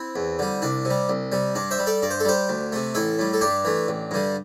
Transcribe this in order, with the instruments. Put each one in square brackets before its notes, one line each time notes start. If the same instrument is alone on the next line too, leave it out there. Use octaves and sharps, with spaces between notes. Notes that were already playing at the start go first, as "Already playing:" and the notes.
Already playing: [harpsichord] C4 E4
E2
D3 G3
C2 D4
C3
G3
C2
C3 G3
G2 D4
C5 E5
G3
A4 D5
G2 D5
C5
A4
G3 G4 C5
D2
C3 A3
A1 E4 A4
A2 G3
A4
G2 D4 G4
E3 A3
A1
G2 D3 G3